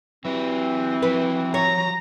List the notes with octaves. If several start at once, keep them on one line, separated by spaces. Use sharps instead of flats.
E3 F#3 C4 G4
F3 F#3 B4
C#5 A#5